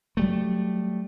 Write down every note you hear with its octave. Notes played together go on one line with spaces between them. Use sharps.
F#3 G3 A3